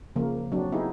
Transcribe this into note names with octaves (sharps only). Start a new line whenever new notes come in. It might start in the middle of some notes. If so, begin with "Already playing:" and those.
C#3 F3 A#3
F#3 C4 D4
B3 D#4 E4 G4 G#4